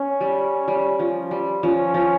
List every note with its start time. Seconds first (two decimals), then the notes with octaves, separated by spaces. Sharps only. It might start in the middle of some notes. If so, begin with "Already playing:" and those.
Already playing: C#4
0.21 G3
0.68 G3
0.99 F3
1.31 G3
1.62 F3 C#4
1.94 F3